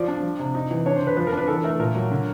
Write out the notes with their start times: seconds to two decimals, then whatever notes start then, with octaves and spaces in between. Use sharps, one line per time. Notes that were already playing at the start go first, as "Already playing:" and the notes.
Already playing: F3 D5
0.08 D4
0.23 F3
0.39 C3
0.55 D#4
0.71 E3
0.86 D4 C#5
0.96 C5
1.02 D3 B4
1.17 F3 B4
1.27 A#4
1.33 D4
1.38 B4
1.48 E3 A4
1.64 A3 A#4
1.79 A#2 A#4
1.95 F#3
2.11 D3